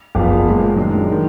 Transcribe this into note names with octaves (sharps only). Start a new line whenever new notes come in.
F#1 F2 F3 B3 F5
B1 A#2 G#3
F#2 D#3 G#3 D4
D#3